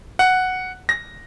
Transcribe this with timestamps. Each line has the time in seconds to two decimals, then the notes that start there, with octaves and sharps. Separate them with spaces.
0.19 F#5
0.89 A#6